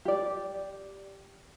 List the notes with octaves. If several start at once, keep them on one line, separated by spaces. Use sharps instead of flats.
G4 D5